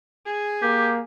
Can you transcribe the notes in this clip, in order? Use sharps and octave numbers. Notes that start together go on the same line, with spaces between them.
G#4 G#5
A#3 G4